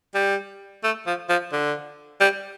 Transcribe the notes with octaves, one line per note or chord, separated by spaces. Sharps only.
G3
A3
F3
F3
D3
G3